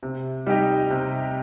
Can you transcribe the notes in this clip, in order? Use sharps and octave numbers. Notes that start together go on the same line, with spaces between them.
C3
G3 D#4 G4 D#5
C3